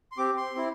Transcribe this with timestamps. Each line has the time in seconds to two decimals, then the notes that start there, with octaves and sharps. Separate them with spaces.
0.12 C6
0.18 C4 G4 D6
0.37 C6
0.55 C4 E4